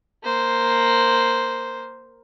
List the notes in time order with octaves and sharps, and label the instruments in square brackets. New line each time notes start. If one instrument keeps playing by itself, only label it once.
[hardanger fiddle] A#3 C5